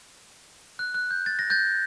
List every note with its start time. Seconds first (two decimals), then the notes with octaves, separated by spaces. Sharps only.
0.79 F#6
0.94 F#6
1.11 G6
1.26 A6
1.39 A#6
1.50 G6 A6